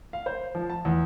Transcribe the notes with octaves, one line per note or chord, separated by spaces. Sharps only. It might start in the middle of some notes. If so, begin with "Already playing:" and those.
F5
C5
F3
A5
E2